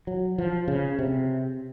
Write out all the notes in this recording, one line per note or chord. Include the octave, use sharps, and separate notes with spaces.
F#3
F3
C#3
C3